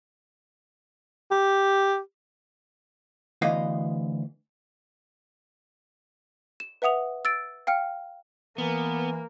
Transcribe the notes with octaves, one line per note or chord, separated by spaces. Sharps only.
G4
D2 E3 B3 D#5 F5
E7
B4 E5 F#5 D#6 F7
E6 A6 D7
F5 G5 F6 C#7
E3 A#3 B3